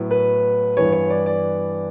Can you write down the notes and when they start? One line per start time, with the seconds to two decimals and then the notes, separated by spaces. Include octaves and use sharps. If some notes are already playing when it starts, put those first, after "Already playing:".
Already playing: A2 F#3 B3
0.11 B4
0.77 G2 E3 B3 C#5
0.92 C#5
1.10 D5
1.26 D5